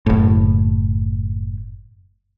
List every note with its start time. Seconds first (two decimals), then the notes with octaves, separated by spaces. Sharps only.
0.06 F#1 A2